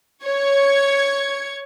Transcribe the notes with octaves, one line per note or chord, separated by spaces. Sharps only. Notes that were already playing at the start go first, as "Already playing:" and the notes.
C#5 C#6 G#6 C#7